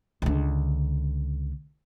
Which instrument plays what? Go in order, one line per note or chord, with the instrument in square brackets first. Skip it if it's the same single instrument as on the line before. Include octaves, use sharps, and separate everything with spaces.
[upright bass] C#2 D3